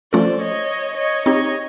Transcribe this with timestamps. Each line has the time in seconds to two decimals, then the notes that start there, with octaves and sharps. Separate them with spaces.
0.13 F3 A3 C#4 F4 A4 C5 D5
0.41 C#5 D#5
0.97 C#5 D#5
1.26 C4 D#4 G4 C#5 D#5